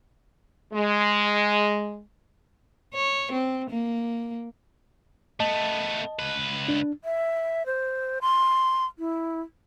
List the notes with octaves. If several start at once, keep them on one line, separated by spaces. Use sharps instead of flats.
G#3
C#5
C4
A#3
A3 B3 D#5 A5
C#2 B4
D4
E5
C5
C6
E4